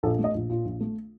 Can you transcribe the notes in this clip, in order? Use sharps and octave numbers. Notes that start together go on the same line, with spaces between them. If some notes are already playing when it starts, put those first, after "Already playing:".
A#1 A4
A3
D#5
A#1
A#2
A#1
A3